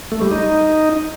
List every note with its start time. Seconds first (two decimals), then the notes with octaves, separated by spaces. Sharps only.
0.12 A3
0.22 G3
0.31 D#4